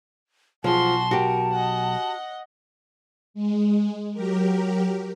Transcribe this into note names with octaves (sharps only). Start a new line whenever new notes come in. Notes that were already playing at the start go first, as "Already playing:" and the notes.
B1 F3 F#4 G#4 A5 C6
F#4 G4 A#4
D#5 F#5
G#3
F#3 G4 A#4